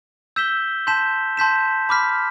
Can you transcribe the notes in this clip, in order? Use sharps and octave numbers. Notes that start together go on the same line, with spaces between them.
E6 G6 B6 E7 G7
A5 C6 G6 B6 E7
A5 C6 G6 B6 E7
B5 D6 F6 B6